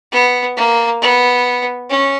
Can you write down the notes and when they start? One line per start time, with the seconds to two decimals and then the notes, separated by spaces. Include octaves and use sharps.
0.12 B3
0.57 A#3
1.01 B3
1.89 C#4